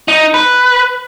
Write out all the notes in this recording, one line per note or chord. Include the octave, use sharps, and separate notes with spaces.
D#4
B4